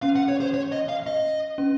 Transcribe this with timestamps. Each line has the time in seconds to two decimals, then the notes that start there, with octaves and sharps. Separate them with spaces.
0.02 C#4 F5
0.16 F#5
0.28 C#5
0.41 C5
0.54 C#5
0.72 D#5
0.89 F5
1.07 D#5
1.58 C#4